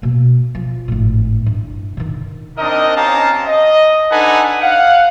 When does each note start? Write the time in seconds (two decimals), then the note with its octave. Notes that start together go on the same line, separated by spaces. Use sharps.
0.02 B2 A#3
0.55 F3
0.88 G#1 A2
1.46 G2 E4
1.97 D3 D#3
2.58 C4 D4 D#4 A#4 D#5
2.97 C4 C#4 G4 F5 A5 A#5
3.46 D#5
4.12 D4 D#4 A4 B4 F#5 G#5
4.62 F5 F#5